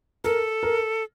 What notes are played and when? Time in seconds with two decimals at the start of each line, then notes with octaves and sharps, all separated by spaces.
0.24 A4 A#4
0.63 A#4